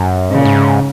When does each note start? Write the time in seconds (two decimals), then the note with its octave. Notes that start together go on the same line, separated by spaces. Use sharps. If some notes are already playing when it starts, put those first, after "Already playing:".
Already playing: F#2
0.31 G#2 C#3
0.38 A#2
0.45 G#2